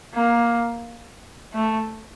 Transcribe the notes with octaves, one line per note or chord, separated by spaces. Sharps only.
A#3
A3